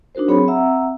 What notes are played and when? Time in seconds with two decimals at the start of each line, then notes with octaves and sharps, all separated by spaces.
0.15 D4 D#4 F#4 A#4 C5
0.28 F#3 C4 G#4 C#5 B5
0.48 C4 E5 F#5 A#5 E6